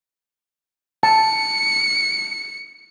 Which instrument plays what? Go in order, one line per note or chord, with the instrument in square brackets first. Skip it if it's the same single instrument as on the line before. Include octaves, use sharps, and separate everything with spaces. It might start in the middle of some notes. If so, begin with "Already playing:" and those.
[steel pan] A5 [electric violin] C#7